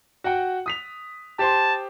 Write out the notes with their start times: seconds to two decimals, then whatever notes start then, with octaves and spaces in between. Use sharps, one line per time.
0.24 F#4 F#5 G5
0.66 D#6 B6 F7
1.39 G4 C5 A5 C6